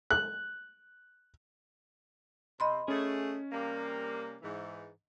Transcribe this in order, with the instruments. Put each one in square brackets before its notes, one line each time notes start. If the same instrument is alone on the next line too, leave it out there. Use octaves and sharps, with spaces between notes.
[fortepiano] F#6
[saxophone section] C3 [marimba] D#5 B5 C6
[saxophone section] A3 G#4 [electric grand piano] C#4
[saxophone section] C3 G3 A#3
G#2 E3